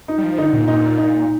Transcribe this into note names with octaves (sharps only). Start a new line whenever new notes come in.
D#4
G3
F3
D3 D#4
A#2
A#2 D#4
D#4